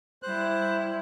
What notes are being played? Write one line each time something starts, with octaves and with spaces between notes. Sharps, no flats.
G3 E4 C5 F#6